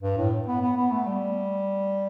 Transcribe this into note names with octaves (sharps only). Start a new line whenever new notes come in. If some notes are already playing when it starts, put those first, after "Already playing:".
G2
A2
B3
B3
B3
A3
G3